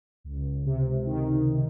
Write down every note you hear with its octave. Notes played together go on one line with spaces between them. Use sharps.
C#2
C3
D#3